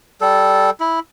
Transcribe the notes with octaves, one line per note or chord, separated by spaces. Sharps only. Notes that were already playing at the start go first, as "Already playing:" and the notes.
G3 A4
E4